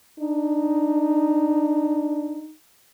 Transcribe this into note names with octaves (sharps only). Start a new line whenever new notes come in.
D4 D#4